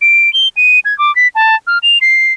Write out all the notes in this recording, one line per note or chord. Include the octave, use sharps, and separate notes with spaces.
D7
G7
D#7
G#6
D6
B6
A5
F6
F7
C7